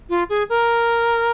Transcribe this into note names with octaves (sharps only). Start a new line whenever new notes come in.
F4
G#4
A#4